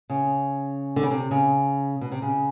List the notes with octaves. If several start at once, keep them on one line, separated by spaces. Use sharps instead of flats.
C#3
D3
C#3
C3
C#3
B2
C3
C#3